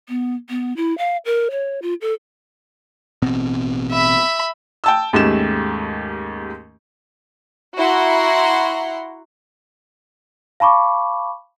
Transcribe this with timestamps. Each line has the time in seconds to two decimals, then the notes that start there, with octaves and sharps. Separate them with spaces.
0.09 B3
0.49 B3
0.77 E4
0.98 F5
1.25 A#4
1.51 C#5
1.82 F4
2.01 A4
3.22 A1 B2 C4
3.91 E5 B5
4.84 G5 A5 E6
5.13 D#2 G#2 A3 C#4 G4 E7
7.76 E4 F#4 F#5 A#5 C6
10.60 F5 A5 B5 C#6 D6